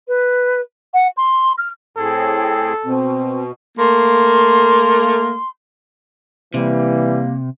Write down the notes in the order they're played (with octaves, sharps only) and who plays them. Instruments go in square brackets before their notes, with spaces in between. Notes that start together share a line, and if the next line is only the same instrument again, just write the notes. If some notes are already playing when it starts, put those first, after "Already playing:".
[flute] B4
F#5
C6
F6
[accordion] A2 C4 G#4 [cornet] A4
[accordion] B2 [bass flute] C4
[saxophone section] A3 A#3 [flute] C6
[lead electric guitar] C3 [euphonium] E3 [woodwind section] G3 A#3